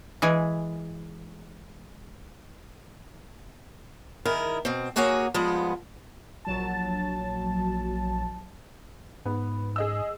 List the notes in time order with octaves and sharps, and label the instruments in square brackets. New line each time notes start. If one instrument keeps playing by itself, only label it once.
[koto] E3 G#3 G#5
[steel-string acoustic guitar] D#3 E4 G#4 A#4
B2 C4
D#2 A#3 F#4 G#4 C#5 G#5
F3 G3 G#3 B3
[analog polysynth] A#1 F#3 A5
[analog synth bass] G#2 [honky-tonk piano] B3
[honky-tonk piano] G#4 D#5 E6